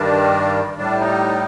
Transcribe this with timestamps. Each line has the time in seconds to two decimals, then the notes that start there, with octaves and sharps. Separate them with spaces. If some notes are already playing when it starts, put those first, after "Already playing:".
Already playing: G2 D#3 G3 D4
0.78 A2 G3 D4
1.00 D#4